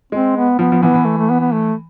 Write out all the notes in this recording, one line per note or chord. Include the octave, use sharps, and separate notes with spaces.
G#3 C4
B3
F3 B3
F3
E3 B3
E3
A3
A3
B3
B3
A3